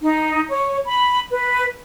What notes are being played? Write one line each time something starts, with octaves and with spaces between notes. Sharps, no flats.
D#4
C#5
B5
B4